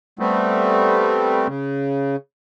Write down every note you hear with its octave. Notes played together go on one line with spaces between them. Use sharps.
G3 A3 B3 C4
C#3